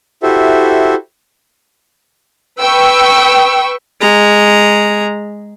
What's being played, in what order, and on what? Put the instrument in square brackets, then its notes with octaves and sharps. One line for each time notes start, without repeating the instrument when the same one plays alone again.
[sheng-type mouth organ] E4 F#4 G4 A4 C5 E5
[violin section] B4 G5 C#6 E6
[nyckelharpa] G#3 A#5